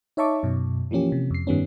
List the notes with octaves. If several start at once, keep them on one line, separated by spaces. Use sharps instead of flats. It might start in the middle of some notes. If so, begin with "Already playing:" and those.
D#4 C#5 E5 A5 C#6 D6
F#2 B2
E3 F3 A#3 C#4 G4
C3
F2 C7
G2 D#3 G3 B3 C#4